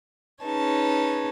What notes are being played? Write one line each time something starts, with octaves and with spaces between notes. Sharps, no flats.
C#4 D#4 G#4 B4 C#5 A5